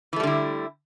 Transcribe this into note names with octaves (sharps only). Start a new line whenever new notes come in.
D3 E3 G3 A3 E4